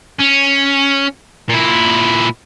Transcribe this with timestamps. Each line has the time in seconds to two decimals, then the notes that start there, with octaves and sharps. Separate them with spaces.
0.20 C#4
1.50 A#2 E4